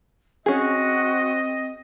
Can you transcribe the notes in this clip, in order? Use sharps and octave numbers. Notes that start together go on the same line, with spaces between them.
C4 C#4 F#4 G#4 D#5